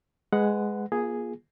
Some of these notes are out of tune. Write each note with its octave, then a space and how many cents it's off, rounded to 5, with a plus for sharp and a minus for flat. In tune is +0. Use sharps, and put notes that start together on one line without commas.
G#3 +0 B4 +20 F#5 +0
A#3 +40 F4 +0 G#4 +0